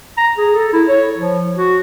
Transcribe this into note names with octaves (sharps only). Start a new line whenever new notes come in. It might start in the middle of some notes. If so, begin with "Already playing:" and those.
A#5
G#4
A4
E4
C#5
F3
F#4